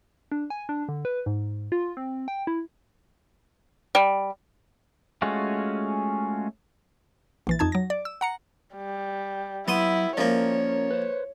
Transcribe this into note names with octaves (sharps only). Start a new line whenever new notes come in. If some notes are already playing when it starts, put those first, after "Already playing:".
D4
G#5
D4
D3
B4
G#2
F4
C4
G5
E4
G3
G#3 A3 C#4 F4 F#4
A#1 E3 A6
F2 D#4 A5 G#6
F#3 A#6
D5
E6
F#5 A#5 C#7
G3
F#3 B3 E4 C6 D#6
F3 A#3 C#4 A#4 C#5 D5
B4 C5